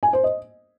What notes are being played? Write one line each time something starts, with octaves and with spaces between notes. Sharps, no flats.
G#5
C5
D#5